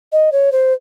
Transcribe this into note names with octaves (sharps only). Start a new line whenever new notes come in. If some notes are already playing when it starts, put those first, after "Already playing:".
D#5
C#5
C5